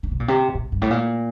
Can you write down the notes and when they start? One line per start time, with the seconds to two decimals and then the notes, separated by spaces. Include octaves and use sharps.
0.03 D3
0.11 C3
0.20 A#2
0.28 C3
0.55 A#2
0.72 G2
0.82 A2
0.90 A#2